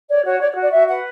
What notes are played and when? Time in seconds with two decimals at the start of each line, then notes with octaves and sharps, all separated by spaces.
0.09 C#5 D5
0.25 F#4 C#5
0.40 C#5 D5
0.52 C#5
0.56 F#4
0.62 D5
0.73 F#4 E5
0.88 B4 F#5